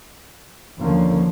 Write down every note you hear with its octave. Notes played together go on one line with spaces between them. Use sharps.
D#2 D3 F3 A#3 C#4